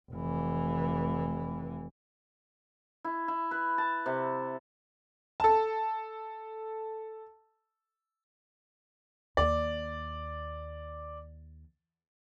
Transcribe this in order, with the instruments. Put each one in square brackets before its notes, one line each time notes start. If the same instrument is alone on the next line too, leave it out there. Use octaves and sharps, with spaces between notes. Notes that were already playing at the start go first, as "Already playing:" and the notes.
[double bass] F1 E3
[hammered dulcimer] E4
E4
B4
A5
C3
[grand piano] A4 A5
[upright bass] D#2 [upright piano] D5